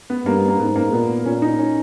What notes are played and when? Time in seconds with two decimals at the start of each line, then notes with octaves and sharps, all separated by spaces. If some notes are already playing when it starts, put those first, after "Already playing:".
0.10 B3
0.26 G2 A#3
0.38 B3
0.48 A#3
0.59 G#2 B3
0.76 A#3
0.93 A#2 B3
1.26 A#2 C#4
1.42 D#4
1.59 C#4